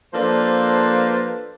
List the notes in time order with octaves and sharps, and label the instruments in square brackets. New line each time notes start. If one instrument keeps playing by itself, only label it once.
[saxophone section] F3 A#3 D4 A4 B4 C5